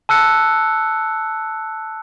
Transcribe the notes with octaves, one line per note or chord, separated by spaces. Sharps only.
A5 E6 F#6 C#7